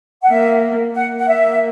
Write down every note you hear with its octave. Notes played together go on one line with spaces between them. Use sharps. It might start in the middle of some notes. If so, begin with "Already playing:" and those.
F#5
A#3 E5
A#3 F#5
F#5
E5